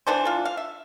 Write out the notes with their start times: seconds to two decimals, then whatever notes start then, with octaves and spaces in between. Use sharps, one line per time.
0.07 E3 B3 D4 A4 C5
0.25 F4 A4
0.45 F5
0.57 E5